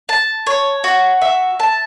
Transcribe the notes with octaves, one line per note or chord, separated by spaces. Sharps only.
A5
C#5
F#4
E5
A5